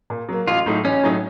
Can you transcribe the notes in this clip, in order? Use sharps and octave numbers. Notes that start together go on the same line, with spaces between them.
A#2
F#3 A#3
A1 F4
A2 F#3 A3 D#4
A1 C#4
A2 F#3 A3 D#4